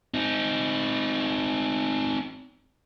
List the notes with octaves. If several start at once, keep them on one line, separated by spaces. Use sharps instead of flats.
C4 D#4